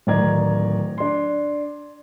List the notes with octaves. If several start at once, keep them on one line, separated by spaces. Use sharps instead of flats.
D1 D#3 D5 D#5 A#5 G#6
D4 C6